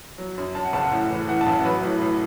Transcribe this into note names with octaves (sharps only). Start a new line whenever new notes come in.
F#3
F#2
F#2 A5
F#5
F#1 A5
F#5
A2
E3
E3 F#5
A5
A1
F#5
F#3 B4
A2
A2